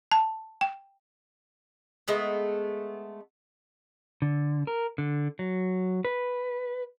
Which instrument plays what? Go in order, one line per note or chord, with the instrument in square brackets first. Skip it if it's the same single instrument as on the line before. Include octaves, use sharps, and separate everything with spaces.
[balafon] A5
G5
[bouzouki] G#3 A3 B3
[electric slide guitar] D3
A#4
D3
F#3
B4